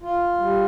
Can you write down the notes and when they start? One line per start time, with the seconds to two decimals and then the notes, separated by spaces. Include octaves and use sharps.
0.03 F4
0.40 G3